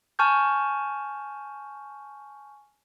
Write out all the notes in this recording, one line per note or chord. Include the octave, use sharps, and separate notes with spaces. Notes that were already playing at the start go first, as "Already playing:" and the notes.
G#5 A5 C#6 F6 G6